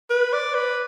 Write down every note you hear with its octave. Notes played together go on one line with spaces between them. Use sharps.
B4
D5
B4